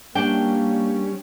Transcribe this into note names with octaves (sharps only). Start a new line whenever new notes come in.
G3 A#3 C#4 D4 G5